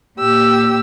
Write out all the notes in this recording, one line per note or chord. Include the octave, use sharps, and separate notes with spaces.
A#2 G4 E6